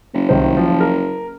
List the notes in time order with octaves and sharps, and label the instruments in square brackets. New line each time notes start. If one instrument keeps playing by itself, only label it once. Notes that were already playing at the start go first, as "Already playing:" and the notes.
[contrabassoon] F#1
[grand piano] C2 D#3 C5
F3
A#4